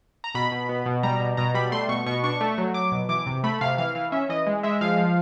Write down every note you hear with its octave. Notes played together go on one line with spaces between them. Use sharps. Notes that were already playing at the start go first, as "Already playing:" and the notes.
A#5
B2 B5
B2
B3
B2
G3 A#5
B2
B2 A#5
G3 B5
A3 C6
B2 C#6
B2 C#6
D4 C#6
A3
F#3
F#3 D6
B2
E3 D6
C3
A3 B5
C3 F5
E3 F5
E3 F5
C#4 E5
E3 D#5
G#3
G#3 E5
F3 F5
F3